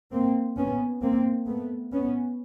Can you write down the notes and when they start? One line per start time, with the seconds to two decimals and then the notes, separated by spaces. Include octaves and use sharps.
0.12 A#3 C4
0.56 B3 C#4
1.02 A#3 C4
1.47 A3 B3
1.92 B3 C#4